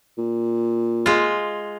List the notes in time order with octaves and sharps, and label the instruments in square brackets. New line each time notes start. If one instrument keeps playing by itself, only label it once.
[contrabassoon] A#2
[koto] G#3 F4